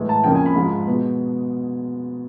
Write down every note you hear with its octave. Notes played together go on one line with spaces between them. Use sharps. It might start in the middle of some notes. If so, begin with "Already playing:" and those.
Already playing: A2 E3 G#3
A5
F2 C#3 F3 A#3 G5
G#5
B5
G#2 F3 G#3
B2 G#3